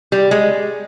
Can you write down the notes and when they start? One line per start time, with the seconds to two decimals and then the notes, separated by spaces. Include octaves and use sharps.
0.12 G3
0.31 G#3